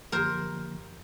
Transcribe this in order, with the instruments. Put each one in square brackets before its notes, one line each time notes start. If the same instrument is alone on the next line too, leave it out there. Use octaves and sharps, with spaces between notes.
[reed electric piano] F#2 D3 F3 A#3 [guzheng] A#4 C5